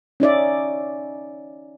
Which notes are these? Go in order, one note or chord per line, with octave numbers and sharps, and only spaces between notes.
C#4 D#4 D5 E5